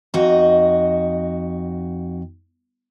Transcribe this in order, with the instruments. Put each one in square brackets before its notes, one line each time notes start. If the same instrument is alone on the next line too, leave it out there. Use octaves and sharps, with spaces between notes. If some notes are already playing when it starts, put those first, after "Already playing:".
[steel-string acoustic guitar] F2 D#4 F#4 D#5